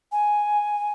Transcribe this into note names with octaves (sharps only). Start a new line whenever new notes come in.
G#5